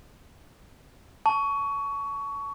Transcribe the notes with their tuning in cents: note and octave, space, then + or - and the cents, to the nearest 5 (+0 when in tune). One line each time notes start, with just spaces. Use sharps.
A5 +0 C#6 +20